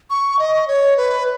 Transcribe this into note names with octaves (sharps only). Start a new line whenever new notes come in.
C#6
D#5
C#5
B4